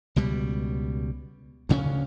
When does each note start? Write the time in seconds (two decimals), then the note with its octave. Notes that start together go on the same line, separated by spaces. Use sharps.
0.16 C#2 B2 G3
1.69 D2 C#3 A#3 C#4